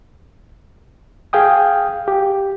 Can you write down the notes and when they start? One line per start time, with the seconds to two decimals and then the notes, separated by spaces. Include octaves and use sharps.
1.33 G#4 F5 G5 D#6
2.08 G4